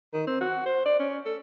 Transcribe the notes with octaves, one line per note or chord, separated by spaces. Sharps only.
D#3
C4
F#4
C5
D5
C#4
A4